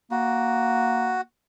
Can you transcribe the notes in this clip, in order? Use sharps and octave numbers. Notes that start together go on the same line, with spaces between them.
A#3 F#4